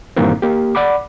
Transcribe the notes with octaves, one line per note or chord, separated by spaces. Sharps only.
G2 A#2 D#3 E3 A#3 C4
A#3 G4
D5 F#5 B5 D6